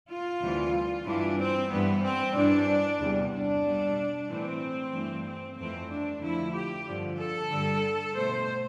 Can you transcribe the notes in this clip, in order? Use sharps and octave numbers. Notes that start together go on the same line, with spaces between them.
F4
D2 C3 E3 G3
G2 E3 G3 D4
C4
G2 E3 G3 B3
C4
G2 E3 G3 D4
E2 C3 G3
D4
B2 G3
A2 E3 A3 C4
G2 E3 A3
C4
F2 E3 A3 C4
D4
F2 D3 F3 A3 E4
G4
G2 D3 F3
A4
G2 D3 G3
B2 A3 C5